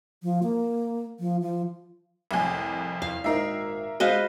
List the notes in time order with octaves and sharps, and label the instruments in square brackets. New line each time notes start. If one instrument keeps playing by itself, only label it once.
[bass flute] F3
A#3
F3
F3
[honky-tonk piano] C2 F2 [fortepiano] A2 G#5
[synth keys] E2 [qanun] F5
[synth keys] G#1 C7 [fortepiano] A#2 D#4 [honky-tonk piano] A#4 E5
[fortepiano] G#3 F4 F5 [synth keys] F#4 [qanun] B4 C5 D#5